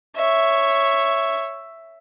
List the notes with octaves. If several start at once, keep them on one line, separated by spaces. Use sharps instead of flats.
C#5 E5